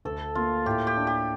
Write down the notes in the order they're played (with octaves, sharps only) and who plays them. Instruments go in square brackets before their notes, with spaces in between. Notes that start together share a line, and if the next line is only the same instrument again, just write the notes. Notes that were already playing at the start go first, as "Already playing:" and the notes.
[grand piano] D2 [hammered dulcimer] A4
[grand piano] A#3 [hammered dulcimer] F4
[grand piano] A2 [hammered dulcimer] G4
[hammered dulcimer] G4
[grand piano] D4
[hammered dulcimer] G4